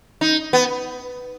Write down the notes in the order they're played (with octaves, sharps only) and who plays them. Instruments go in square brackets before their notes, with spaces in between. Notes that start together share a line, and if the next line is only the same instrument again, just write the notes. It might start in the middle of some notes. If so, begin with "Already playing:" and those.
[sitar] D#4
B3